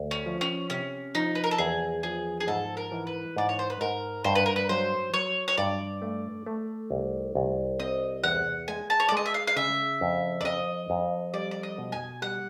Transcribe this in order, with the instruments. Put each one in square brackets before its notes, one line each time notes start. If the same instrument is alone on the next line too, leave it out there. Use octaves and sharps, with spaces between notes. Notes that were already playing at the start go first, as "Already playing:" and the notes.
Already playing: [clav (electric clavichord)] D2
[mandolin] C#4
[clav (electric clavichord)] F3
[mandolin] C#4
[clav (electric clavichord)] C3 [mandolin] C#4
[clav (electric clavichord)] F3 [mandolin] D#4
[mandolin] B4
A#4
A4
[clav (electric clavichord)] E2 [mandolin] G#4
[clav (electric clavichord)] F3 [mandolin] G#4
[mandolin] G#4
[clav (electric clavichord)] G#2 [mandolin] A4
[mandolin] A#4
[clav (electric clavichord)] E3
[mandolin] B4
[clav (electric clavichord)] G#2 [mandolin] D5
[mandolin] C#5
C5
B4
[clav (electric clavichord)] G#2 [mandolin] A#4
[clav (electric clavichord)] G2 [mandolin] C5
[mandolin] B4
A#4
B4
[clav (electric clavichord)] F#3 [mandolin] C5
[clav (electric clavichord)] F#3 [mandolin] C#5
[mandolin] C#5
[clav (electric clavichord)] G2 [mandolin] D5
[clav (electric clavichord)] A3
A3
C2
C2
[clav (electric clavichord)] C4 [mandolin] D#5
[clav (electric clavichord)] E2 [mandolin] F#5
[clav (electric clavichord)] G#3 [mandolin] G#5
[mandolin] A5
C#5
D5
[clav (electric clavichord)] G#3 [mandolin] D#5
[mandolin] E5
F5
F5
[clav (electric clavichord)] C#3 [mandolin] E5
[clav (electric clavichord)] F2
[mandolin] D5
[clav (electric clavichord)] F2 [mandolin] D#5
[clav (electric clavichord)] F2
[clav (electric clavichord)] G3 [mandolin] D5
[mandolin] D5
D#5
[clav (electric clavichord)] B2
[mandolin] G#5
[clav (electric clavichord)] G3 [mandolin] F#5